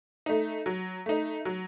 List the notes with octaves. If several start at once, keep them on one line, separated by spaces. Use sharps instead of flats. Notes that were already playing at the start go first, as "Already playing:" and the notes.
A3 D#4
F#3
A3 D#4
F#3